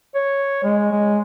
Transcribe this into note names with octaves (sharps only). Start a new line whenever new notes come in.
C#5
G#3
G#3